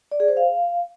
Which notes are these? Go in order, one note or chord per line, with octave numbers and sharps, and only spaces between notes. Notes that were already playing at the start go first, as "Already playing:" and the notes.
D5
G#4
C5
F5